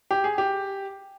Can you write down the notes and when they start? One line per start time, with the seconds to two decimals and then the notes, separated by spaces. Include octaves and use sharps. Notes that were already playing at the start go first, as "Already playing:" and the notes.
0.11 G4
0.24 G#4
0.38 G4